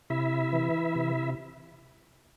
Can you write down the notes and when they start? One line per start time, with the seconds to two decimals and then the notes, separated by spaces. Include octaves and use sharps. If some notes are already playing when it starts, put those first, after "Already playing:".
0.10 C3 E4 E5
0.53 E3
0.96 C3